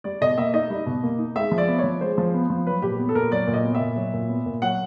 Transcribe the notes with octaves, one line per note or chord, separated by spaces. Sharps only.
G3 D5
B2 D#5
A#3 E5
D#4 D#5
G3
B2
A#3
D#4
G#3 E5
F3
D5
B3
C#5
F3
G#3 C5
F3
B3
F3
F#3 B4
A#2 G4
B3
A4
A#2 A#4
F#3 D5
A#2
D#5
B3
E5
A#2
F#3
A#2
B3
A#2
F#3 F#5